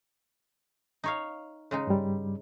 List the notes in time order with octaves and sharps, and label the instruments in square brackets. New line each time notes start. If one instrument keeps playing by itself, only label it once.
[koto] D#4 C#5 F5
C#3 G#3 D#4
[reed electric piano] G2 G3